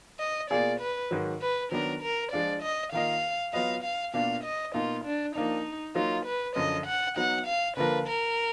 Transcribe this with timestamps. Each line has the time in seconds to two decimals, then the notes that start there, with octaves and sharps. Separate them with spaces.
0.20 D#5
0.50 B2 A#3 F4 G#4 D5
0.81 B4
1.11 G#2 D#3 F#3
1.42 B4
1.71 D#3 F#3 B3 D4 A#4
2.02 A#4
2.32 F3 G#3 D4 F4 D5
2.63 D#5
2.92 D#3 A#3 F4 A#4 D#5 F5
3.53 F#3 B3 F4 B4 D#5 F5
3.83 F5
4.14 B2 A#3 D4 F4 A#4 F5
4.44 D#5
4.74 B2 A#3 D#4 F4
5.05 D4
5.35 F3 A#3 D4 D#4
5.95 F#3 A#3 D#4 F4
6.26 B4
6.56 F#2 D3 F3 D#5
6.87 F#5
7.16 F#3 B3 D#4 F#5
7.46 F5
7.77 D3 F3 A#3 F4 A#4 B4
8.08 A#4